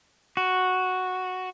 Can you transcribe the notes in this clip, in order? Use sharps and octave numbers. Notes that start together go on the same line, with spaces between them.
F#4